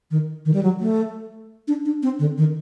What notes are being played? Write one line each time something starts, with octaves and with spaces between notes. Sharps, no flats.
D#3
D#3
G3
F#3
A3
D4
D4
C4
D3
D#3